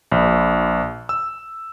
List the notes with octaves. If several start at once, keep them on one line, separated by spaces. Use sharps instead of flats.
A#1
E6